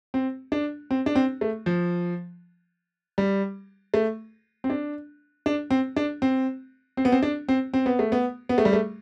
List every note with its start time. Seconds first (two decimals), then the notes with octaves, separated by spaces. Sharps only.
0.14 C4
0.52 D4
0.91 C4
1.06 D4
1.15 C4
1.41 A3
1.66 F3
3.18 G3
3.94 A3
4.64 C4
4.70 D4
5.46 D4
5.70 C4
5.96 D4
6.22 C4
6.97 C4
7.05 B3
7.12 C4
7.23 D4
7.49 C4
7.74 C4
7.86 B3
7.99 A3
8.12 B3
8.49 B3
8.58 A3
8.65 G3
8.73 A3